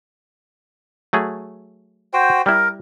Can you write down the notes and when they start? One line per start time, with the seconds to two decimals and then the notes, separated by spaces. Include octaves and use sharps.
1.13 F#3 A3 G#4
2.13 F#4 C5 G5
2.46 G3 E4 A#4